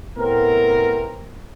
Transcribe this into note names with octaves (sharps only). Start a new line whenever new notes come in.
A2 C3 B3 C4 A#4